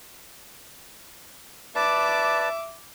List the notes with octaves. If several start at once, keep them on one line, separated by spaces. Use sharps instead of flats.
B4 D5 E5 A5 D6